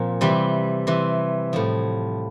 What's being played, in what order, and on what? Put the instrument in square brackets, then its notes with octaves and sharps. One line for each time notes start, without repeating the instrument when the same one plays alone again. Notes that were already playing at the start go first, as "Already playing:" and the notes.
Already playing: [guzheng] A#2 F3 C4
C3 E3 G3
C3 E3
A2 F3